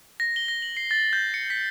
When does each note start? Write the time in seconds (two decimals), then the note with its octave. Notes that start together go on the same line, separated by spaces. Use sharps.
0.20 A#6
0.36 G7
0.48 A#6
0.62 F#7
0.77 C7
0.91 A6
1.13 G6
1.34 C#7
1.50 B6